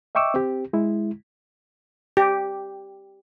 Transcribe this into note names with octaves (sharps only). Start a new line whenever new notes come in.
D#5 E5 G5 C#6 D6 E6
C4 G4
G#3 E4
G4